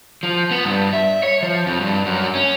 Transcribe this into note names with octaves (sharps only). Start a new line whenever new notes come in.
F3
B3
G2
E5
C#5
F3
F2
G2
F#2
C#4